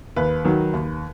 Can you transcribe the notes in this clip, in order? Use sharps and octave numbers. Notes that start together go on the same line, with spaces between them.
D#2 B4
D#3 F#3
D#2